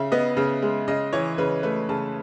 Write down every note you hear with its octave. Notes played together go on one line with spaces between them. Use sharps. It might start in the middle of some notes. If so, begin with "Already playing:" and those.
Already playing: C#3 E5
B3 D#5
C#3
G#3
C#3 D#5
E3 C#5
C#3 B4
A3 B4
C#3 A5